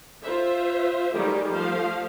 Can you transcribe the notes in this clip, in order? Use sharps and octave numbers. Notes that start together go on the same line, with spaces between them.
F4 C5 E5
D#3 F#3 G3 A3 G4 G#4
F3 A3 C5 F5